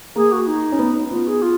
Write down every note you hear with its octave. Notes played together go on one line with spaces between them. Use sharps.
A#3 G#4
F#4
D#4
C#4
B3
B3 F4
G#4
F4